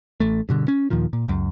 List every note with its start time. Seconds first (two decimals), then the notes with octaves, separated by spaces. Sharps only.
0.20 A1 A3
0.49 G2 B2 D3
0.68 C#4
0.90 D#2 A#2 D#3 F3
1.13 A#2
1.28 C#2 F#2